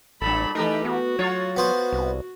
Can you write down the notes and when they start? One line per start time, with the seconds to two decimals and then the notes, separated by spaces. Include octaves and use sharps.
0.21 A1 G2 A#2 A4 B5
0.55 E3 A3 D#4 G4 A#4 B4
0.85 B3 F#4
1.19 F#3 F4 C#5
1.57 B3 F#4 C5
1.93 C2